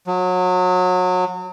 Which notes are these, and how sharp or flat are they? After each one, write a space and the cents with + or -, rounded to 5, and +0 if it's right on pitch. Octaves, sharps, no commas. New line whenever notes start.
F#3 -25